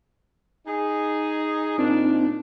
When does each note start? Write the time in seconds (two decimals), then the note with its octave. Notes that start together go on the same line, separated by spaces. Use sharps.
0.67 D#4 G#4
1.78 A#2 C4 D4 D#4